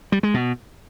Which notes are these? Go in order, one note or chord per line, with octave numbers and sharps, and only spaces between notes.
G3
G#3
B2